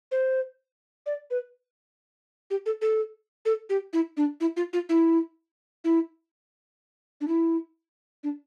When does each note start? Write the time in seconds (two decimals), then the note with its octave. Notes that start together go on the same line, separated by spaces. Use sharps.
0.12 C5
1.06 D5
1.31 B4
2.51 G4
2.66 A4
2.82 A4
3.46 A4
3.70 G4
3.93 E4
4.17 D4
4.41 E4
4.57 F4
4.73 F4
4.89 E4
5.85 E4
7.21 D4
7.28 E4
8.24 D4